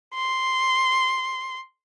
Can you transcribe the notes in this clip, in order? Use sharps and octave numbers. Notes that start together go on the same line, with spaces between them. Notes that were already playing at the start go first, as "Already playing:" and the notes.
C6